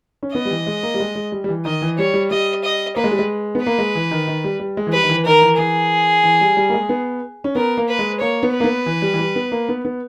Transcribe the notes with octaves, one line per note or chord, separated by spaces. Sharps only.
C#4
B3 D#5
G3
E3
G#3
A#3
G3
G#3
G#3
G3
G3
E3
D#3 D#5
E3
G3 C#5
G3
G3 D#5
D#5
A#3 B4
G#3
G3
G#3
B3
A#3 B4
G#3
E3
D#3
D#3
G3
G3
G#3
E3
G3 B4
D#3
E3
D#3 A#4
E3
E3 G#4
E3
G3
G3
A#3
G#3
B3
C#4
B3 A#4
A#3
B4
G#3
A#3 C#5
B3
B4
A#3
B3
E3
G3
E3
G3
B3
A#3
B3
B3